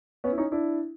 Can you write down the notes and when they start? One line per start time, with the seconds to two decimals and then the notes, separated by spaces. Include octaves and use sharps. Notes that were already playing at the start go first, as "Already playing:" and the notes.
0.24 B3 C#4
0.32 E4
0.38 C#4 D#4
0.52 D4 E4